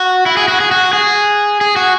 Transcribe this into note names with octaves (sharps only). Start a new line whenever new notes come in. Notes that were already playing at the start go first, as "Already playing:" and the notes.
Already playing: F#4
E4
G#4
F#4
G#4
F#4
G#4
G#4
F#4